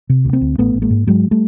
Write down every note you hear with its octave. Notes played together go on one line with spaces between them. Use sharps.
C3
D2
A#3 C4
D2
A1 A3 B3
A1
G#3 A#3
G#2
G#2 F#3 G#3
G3 A3